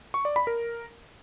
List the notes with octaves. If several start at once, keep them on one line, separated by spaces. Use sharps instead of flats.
C#6
D5
B5
A#4